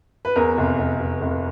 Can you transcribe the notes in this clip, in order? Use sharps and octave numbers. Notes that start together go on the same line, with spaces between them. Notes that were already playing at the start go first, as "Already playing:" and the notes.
B4
E2 A#4
F1
F1
F1
F1